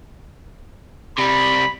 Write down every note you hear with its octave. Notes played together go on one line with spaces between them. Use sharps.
C3 G3 B5